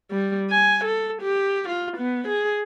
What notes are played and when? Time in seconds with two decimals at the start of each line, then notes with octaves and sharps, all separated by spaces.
0.11 G3
0.50 G#5
0.85 A4
1.22 G4
1.69 F4
1.97 B3
2.28 G#4